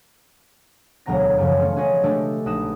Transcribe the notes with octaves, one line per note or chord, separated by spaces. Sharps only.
E1 D2 F#3 B3 A#5 A#6
F#2 C#3 F3
G#3 A3 C#4
C#4 F#4 G#4 B4 D#5 G#5
G#3 A3 D4 G4 A4
A#1 D#4 B4 D#6 E7